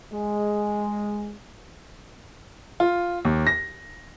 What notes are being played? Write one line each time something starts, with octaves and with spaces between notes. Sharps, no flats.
G#3
F4
D#2
A#6